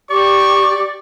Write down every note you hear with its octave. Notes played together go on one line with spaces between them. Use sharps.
G4 D5 C#6